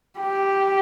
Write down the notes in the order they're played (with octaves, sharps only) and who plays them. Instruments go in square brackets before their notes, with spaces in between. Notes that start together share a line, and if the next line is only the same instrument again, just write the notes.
[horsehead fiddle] G4